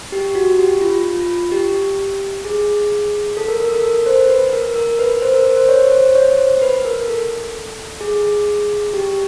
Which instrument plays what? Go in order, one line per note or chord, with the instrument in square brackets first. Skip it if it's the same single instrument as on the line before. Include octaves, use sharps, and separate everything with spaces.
[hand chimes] G4
F#4
G4
F4
F4
F4
G4
G#4
A4
A#4
A#4
A4
A#4
C5
B4
A#4
A#4
B4
C5
A#4
C5
C#5
C5
C#5
C5
B4
A#4
A4
G#4
G4